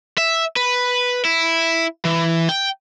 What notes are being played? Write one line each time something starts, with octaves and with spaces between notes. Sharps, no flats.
E5
B4
E4
E3
G5